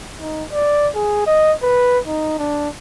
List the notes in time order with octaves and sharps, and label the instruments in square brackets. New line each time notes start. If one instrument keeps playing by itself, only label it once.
[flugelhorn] D#4
D5
G#4
D#5
B4
D#4
D4